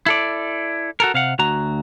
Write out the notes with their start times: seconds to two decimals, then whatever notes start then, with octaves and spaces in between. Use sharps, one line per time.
0.06 E4 A4 D5
1.00 F#4 A4 A#4
1.14 C3 F5 F#5
1.39 D2 F#4 A#5